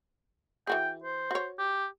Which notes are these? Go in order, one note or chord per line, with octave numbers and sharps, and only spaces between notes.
E3 F#4 G#4 G5
C5
F#4 C#5
G4